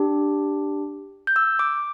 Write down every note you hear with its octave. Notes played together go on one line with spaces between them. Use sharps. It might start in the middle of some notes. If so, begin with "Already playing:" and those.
Already playing: D4 G4
G6
E6
D6